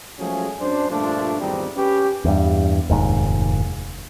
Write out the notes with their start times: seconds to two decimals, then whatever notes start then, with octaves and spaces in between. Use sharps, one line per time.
0.19 F3 F#3 G#3 A3 C#4 G#4
0.60 F#2 D4 C5
0.90 G2 A#2 F3 A3 D4
1.40 G#1 E2 F3 G3 C4 D#4
1.76 C#4 G4 B4
2.25 E2 G2
2.90 F1 D#2 G#2